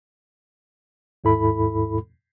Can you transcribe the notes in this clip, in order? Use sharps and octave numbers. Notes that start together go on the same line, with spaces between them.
D#2 G#2 E4 A4 B5